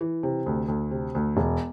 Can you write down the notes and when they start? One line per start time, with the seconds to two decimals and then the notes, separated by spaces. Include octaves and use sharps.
0.01 E3
0.23 C3
0.46 D2
0.68 D2
0.91 C3
1.15 D2
1.37 E1